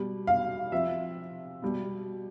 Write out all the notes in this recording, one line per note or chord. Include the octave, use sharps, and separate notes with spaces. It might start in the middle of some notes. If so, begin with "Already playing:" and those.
Already playing: B2 G3
F5
C3 F3 E5
B2 G3